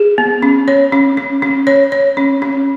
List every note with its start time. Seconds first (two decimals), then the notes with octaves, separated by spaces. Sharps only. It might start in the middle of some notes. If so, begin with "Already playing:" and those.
Already playing: G#4
0.18 B3
0.43 C#4
0.68 C#5
0.92 C#4
1.17 C#4
1.42 C#4
1.67 C#5
1.92 C#5
2.17 C#4
2.42 C#4